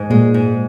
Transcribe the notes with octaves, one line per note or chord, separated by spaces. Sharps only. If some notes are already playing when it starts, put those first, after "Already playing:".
Already playing: G#2
A#2 G#3
G#2